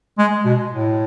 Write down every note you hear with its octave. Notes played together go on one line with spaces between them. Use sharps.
G#3
B2
A2